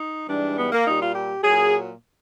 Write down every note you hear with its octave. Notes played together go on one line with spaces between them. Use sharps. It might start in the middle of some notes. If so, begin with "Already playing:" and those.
Already playing: D#4
G#2 E3 G3 D4
B3
A#3
A#2 G3 D#4
F4
G4
A#2 F#3 G#4